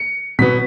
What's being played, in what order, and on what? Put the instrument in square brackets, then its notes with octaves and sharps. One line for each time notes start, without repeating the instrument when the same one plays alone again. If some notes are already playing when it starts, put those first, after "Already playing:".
Already playing: [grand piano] C#7
B2 F#3 B3 B6